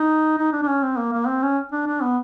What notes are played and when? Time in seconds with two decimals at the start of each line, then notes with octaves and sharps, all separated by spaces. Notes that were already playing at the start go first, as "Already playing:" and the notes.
Already playing: D#4
0.38 D#4
0.53 D4
0.63 D4
0.68 C#4
0.82 C4
0.97 A#3
1.12 A#3
1.27 C4
1.42 C#4
1.72 D4
1.87 D4
2.02 B3